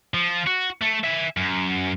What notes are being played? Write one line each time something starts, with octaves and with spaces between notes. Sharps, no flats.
F3
F#4
A3
E5 G#5
F#2